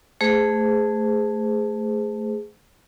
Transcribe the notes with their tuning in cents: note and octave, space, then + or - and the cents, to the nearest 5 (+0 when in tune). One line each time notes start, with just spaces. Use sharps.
A3 +0 G#4 +0 C5 -25